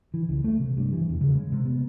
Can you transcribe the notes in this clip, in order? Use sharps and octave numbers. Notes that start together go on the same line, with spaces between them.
E3
C#2
A3
C3
G2
E3
E2
C#3
G#3
C3
B3